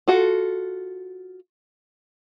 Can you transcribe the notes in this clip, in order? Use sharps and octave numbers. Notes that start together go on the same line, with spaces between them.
F4 F#4 A4